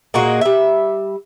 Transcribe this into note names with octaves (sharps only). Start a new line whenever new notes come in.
A#2 G#3 A#3 F#4
G3 E5